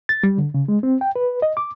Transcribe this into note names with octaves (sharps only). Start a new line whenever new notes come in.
A6
G3
D3
C#3
G#3
C4
G5
B4
D#5
D6